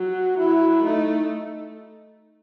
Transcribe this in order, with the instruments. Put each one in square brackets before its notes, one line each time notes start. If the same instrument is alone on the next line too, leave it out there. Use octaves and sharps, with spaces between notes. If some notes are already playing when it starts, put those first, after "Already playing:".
Already playing: [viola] F#3 [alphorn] F#4
[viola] F#3 [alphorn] E4
[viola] A3 [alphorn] D#4